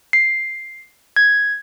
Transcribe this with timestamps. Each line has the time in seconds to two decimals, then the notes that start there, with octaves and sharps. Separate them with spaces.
0.13 C7
1.16 G#6